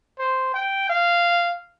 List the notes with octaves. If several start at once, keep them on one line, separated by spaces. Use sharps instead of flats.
C5
G5
F5